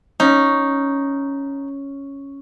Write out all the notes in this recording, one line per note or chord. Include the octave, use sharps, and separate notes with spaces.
C#4 D#4